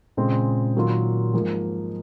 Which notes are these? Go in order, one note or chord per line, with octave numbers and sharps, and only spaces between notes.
A#2 C#3 G#3 C4
D#3 F#3 A#3 F4
G#2 F3 A#3